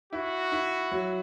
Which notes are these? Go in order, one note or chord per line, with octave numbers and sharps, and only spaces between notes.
E4 F#4
E4
F#3